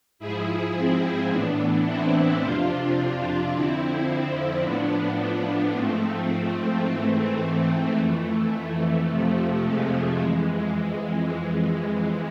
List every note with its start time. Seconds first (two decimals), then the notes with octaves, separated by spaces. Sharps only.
0.19 G#2 F3 E4 G#4
0.74 C4 E4
1.30 A2 E3 B3 D4
1.86 C4 E4
2.42 F2 C3 F3 D4 F4
3.52 F2 D3 F3 C4 E4
4.09 C4 E4
4.63 A2 F3 B3 D4
5.75 G#2 F3 A3 C4
6.30 A3 C4
6.87 G#2 E3
7.42 A3
7.98 F2 E3
9.09 F2 C3 F3 A3
9.65 G#3
10.20 F2 E3
10.75 G#3